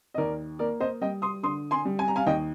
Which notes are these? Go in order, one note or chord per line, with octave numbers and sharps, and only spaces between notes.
D#5
D#2 A#4 D5
A#3 A#4 D5
C5 D#5
G3 D#5 G5
C6 D#6
D3 C6 D#6
G#5 C6
G3
G#5
A#5
F5 G#5
D#2 D#5 G5